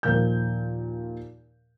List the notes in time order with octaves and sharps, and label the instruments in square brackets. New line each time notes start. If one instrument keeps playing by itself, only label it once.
[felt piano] D#2 A#2 F3 A#4 G6